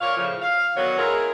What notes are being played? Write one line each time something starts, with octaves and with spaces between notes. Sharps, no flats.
A#2 C#5 F5
A2 C#3 F3
F5
D3 D#3 F#3 B3 F#4 C#5
G#3 E4 F4 G#4 A#4